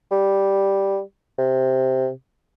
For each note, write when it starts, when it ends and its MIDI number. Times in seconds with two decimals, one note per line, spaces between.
0.11 1.00 55
1.38 2.10 48